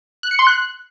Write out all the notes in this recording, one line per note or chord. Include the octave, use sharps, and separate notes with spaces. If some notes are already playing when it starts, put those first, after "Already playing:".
F#6
C#7
C6
F#6